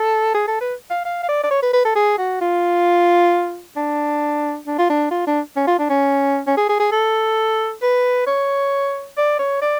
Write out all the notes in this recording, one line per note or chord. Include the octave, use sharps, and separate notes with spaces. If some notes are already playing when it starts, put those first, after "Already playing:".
Already playing: A4
G#4
A4
B4
F5
F5
F5
D5
D5
C#5
B4
B4
A4
G#4
F#4
F4
D4
D4
F4
D4
F4
D4
C#4
F4
D4
C#4
C#4
G#4
G#4
G#4
A4
B4
C#5
D5
C#5
D5